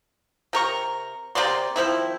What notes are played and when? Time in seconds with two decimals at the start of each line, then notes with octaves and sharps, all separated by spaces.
0.53 C3 A#4 C#6
1.35 C3 A#3 D5 C6
1.76 D#3 F3 C4 E4